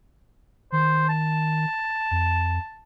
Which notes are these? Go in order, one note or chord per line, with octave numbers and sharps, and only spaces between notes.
D#3 C5
A5
F2